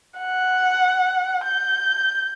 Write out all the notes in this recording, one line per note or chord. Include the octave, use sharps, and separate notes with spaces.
F#5
G6